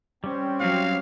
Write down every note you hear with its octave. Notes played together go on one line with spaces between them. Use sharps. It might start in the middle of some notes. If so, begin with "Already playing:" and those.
G3 C4 C#4
F#3 F5